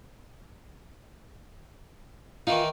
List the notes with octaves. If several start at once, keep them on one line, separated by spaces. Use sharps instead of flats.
D#3 E3 D#4 F4